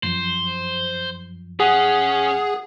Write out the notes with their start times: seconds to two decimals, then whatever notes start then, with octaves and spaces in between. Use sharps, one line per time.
0.03 F#2 F3 C5
1.60 C#4 G#4 F#5